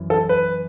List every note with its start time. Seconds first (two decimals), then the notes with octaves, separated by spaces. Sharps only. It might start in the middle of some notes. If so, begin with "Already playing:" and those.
Already playing: F#2 E3
0.10 A4
0.29 B4